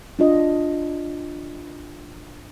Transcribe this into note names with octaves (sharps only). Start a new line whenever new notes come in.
D4 F4 D#5